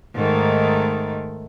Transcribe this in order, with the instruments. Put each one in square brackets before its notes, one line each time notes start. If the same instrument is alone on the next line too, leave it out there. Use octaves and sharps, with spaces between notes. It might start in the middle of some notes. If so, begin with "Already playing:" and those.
[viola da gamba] G#2 D#3 A3